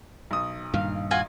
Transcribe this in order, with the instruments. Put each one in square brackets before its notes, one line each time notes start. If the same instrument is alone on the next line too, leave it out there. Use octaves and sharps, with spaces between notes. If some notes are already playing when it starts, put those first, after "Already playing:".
[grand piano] B1 D#6
[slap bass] G2 A#2 D#3 [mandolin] F5
[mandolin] F4 F#4 G#5